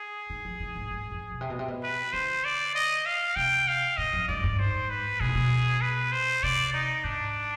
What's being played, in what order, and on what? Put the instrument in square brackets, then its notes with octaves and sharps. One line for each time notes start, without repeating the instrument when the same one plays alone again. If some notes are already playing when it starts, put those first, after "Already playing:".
Already playing: [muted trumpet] G#4
[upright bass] D#3
F3
D#3
G#2
G2
F2
B2
C3
B2
C3
B2
[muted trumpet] B4
[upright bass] D3 [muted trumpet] C5
[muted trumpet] D5
D#5
F5
[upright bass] C3 [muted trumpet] G5
[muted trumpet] F5
[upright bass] G#2 [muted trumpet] D#5
[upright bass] F2
[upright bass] G2 [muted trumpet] D5
[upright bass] G2
[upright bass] G#2 [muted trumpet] C5
[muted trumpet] B4
[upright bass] B2 [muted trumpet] G#4
[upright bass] G#2
B2
[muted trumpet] B4
C5
[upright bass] C3 [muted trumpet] D5
[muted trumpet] D#4
[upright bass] G#2 [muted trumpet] D4